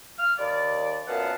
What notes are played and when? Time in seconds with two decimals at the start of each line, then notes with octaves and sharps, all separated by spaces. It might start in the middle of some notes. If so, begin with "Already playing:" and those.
0.19 F6
0.38 D#2 D5
1.08 F#2 A#2 B3 F5 F#5 A5